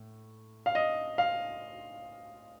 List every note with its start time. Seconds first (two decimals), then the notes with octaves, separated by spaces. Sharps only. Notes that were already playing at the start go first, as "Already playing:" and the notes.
Already playing: A2
0.66 F5
0.75 D#5
1.18 F5